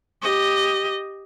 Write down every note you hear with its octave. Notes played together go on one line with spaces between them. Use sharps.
G4 D#5